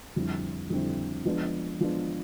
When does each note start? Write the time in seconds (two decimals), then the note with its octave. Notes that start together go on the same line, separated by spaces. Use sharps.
0.16 F2 D3 G3 C4 E4
0.70 F2 D3 G3 C4 E4
1.25 F3 G#3 B3 D4
1.81 F3 G#3 B3 D4